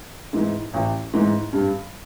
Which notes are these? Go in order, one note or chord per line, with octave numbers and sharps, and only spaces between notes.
G#2 E3
A1
G#2 E3
G2